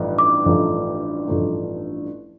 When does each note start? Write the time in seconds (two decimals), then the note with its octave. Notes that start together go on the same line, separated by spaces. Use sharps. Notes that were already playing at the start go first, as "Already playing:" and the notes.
Already playing: A1 G2 F3 A3 D#4
0.19 D6
0.45 A1 G2 F3 A3 D#4
1.27 A1 G2 F3 A3 D#4